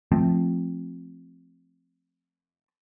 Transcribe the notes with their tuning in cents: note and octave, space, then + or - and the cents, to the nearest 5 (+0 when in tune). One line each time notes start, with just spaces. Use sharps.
F3 +0 A3 +0 C4 +5